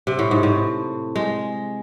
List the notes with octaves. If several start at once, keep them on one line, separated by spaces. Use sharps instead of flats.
C3
A2
G#2
A2
G#3